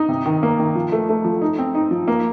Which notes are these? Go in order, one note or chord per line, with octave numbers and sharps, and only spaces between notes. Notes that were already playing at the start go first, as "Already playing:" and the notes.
Already playing: D#4
C3
D#3
A#3
D#3
F3
A3
A3
F3
D#4
C4
D#4
F3
A#3